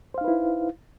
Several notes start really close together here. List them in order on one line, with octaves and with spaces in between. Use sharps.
C5 F5 D#4 B4 E4